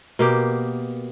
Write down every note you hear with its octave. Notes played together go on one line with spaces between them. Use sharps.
B2 A#3 G4